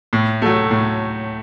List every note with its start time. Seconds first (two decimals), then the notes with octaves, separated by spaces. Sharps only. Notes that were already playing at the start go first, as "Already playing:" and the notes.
0.13 A2
0.42 F#3 A3
0.71 A2